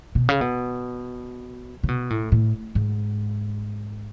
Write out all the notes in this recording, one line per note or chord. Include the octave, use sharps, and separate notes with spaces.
B2
C#3
B2
C#3
B2
A2
A2
G#2